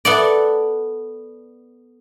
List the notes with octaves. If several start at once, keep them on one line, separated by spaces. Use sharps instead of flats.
B3 A4 D5